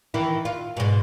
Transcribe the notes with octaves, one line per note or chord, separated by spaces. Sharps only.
D#3 E3 E4
F4
G#2 B2